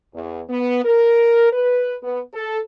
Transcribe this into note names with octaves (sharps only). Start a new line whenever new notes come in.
E2
B3
A#4
B4
B3
A4